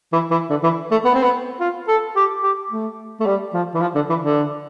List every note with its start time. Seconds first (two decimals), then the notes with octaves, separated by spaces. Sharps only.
0.12 E3
0.31 E3
0.50 D3
0.63 E3
0.91 A3
1.05 B3
1.14 C4
1.23 B3
1.60 F4
1.88 A4
2.16 G4
2.43 G4
2.70 A3
3.20 A3
3.26 G3
3.54 F3
3.74 E3
3.81 F3
3.95 D3
4.09 E3
4.22 D3